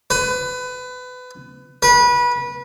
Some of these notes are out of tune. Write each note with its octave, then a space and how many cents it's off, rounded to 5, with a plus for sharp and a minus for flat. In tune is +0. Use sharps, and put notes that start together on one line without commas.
B4 +25
B4 -25